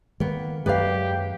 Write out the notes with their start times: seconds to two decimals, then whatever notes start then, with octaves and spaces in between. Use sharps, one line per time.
0.20 D#3 A#3 B3
0.66 F#2 F#3 G#3 G4 B4 D5 F5